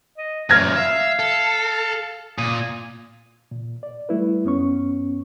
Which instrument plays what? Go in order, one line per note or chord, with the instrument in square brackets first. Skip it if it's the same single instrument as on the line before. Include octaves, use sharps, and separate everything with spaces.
[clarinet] D#5
[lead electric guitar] F#2 A#2 [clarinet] A3 [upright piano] F6 G#6 A#6
[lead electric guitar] E5 [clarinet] F5
[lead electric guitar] A4
[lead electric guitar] A#2 [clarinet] D#6
[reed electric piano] A#2
D5
G3 A3 E4 B4
F#2 B3 C#4 C#6